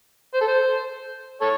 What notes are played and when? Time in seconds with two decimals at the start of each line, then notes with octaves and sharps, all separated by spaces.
0.34 C5
0.41 A4
0.48 C5
1.41 A4 C#5